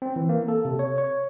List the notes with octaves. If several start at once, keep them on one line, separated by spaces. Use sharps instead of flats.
C4
E3
A#3
A4
C3
C#5
C#5